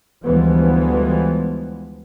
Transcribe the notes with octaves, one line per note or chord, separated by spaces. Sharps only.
D2 E3 F3 G3 G#3 B3